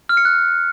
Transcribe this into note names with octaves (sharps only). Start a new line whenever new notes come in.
F6
C#7
F#6